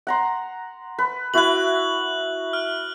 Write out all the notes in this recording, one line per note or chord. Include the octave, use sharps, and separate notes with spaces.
F#5 A#5 C6
B4
E4 F#4 B4 F#6 F#7
F6